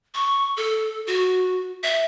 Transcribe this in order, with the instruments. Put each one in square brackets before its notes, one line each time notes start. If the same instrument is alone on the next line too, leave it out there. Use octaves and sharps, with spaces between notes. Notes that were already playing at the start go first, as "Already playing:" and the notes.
[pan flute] C#6
A4
F#4
E5